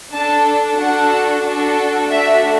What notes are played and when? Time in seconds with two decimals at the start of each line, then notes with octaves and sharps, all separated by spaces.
0.12 D4 A4 A5
0.77 D4 F#4 A4 F#5
1.44 D4 F#4 A4
2.10 A3 D4 F#4 E5